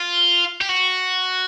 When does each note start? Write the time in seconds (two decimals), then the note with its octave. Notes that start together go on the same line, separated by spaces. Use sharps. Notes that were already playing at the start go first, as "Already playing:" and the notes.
Already playing: F4
0.61 G4
0.69 F#4